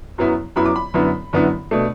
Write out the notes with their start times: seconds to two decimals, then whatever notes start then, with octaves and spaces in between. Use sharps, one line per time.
0.18 F#2 F#3 B3 E4
0.56 F#2 F#3 B3 E4 B5
0.66 D6
0.76 B5
0.94 F#2 D3 B3 E4
1.33 F#2 D3 B3 E4
1.71 B2 A3 D4